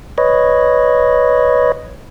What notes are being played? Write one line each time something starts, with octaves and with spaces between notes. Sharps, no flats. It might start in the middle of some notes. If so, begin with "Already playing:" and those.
B4 C#5 D#5